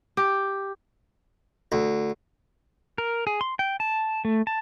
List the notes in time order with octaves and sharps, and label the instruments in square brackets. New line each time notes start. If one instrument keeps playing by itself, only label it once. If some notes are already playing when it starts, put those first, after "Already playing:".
[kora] G4
[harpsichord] D2
[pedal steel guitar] A#4
G#4
C6
G5
A5
A3
A5